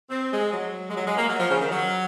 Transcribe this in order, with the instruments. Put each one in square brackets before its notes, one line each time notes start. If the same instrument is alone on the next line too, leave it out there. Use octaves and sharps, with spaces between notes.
[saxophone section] C4
G#3
F#3
G#3
F#3
G#3
A#3
F#3
F3
C#3
D#3
F#3